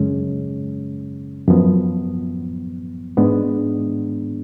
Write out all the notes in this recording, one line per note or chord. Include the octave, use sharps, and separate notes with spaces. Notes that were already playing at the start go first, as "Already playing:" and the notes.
Already playing: F#2 C#3 G#3 C#4
F#2 F3 B3
G#2 G#3 B3 D4